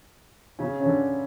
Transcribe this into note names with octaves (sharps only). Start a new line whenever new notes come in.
C#3 C#4
C#4
D3 D4